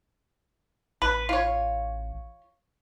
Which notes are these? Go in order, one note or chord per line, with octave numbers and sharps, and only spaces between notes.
A1 B4
F4 C#5